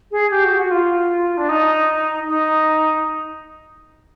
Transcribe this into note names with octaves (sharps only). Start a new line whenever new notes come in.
G#4
G4
F#4
F#4
F4
D4
D#4
D#4